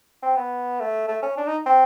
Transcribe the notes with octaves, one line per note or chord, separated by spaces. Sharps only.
C4
B3
A3
A3
C#4
D4
D#4
C4